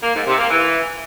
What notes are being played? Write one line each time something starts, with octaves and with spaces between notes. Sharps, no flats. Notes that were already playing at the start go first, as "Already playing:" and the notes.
A#3
G#2
C3
A#3
E3